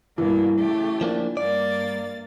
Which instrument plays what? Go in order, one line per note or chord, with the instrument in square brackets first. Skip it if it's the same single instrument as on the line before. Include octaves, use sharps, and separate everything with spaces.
[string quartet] G2 B2 A#3 [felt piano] E3
[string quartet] C#3 A3 G4
[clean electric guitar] F3 A#3 D4
[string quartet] G2 A#3 A6 [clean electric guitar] D5